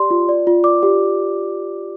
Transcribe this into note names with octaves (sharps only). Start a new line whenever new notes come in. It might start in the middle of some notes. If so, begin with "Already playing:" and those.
Already playing: G4 D5 C6
F4
D5
F4
D5 D6
G4